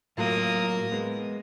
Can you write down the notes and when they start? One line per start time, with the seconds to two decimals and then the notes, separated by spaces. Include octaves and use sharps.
0.18 A2 F#3 A#3 F4 D#6
0.92 G#3 B3